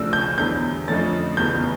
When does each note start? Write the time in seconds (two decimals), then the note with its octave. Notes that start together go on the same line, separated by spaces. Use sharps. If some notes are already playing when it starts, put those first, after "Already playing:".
Already playing: D2 C#3 F3 A3 D4 E6
0.13 G6
0.38 E2 D3 G3 G6
0.88 F2 D3 F3 A3 C#4 A6
1.37 F1 E2 C#3 G3 G6